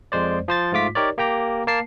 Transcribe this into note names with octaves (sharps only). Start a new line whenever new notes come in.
F2 G#3 C5 D5
F3 C5 A6
G#2 A3 F4 D6 B6
D#4 G4 A#4 C#5 D5
A#3 G4 G5 A#5
A#3 A#4 A5 C7